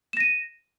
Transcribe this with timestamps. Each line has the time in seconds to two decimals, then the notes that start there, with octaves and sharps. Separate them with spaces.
0.13 E7
0.17 A#6
0.20 D#7